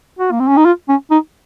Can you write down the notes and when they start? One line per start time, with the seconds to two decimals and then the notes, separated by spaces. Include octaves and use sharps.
0.19 F#4
0.32 A#3
0.40 C4
0.48 C#4
0.57 D#4
0.65 F4
0.89 C#4
1.11 D#4